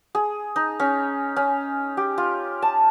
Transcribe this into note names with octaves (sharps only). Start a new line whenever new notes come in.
G#4
D#4
C#4
C#4
G4
F4
A5